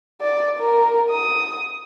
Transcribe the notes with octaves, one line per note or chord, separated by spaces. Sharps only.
D5
A#4
D#6